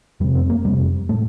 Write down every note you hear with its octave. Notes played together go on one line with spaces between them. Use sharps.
F2 C3 G3
C4
A#3
F2 C3 G3
A2 A3